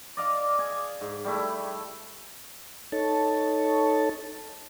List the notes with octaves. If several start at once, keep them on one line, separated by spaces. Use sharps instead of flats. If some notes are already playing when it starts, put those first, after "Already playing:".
D5 D#5 F5 D6
G#4 G#5
G#2
G3 A3 E4
D#4 A4 C#5 A5